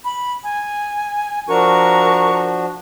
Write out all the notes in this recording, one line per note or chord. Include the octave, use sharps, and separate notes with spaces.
B5
G#5
F3 D4 F#4 A#4 A#5 C#6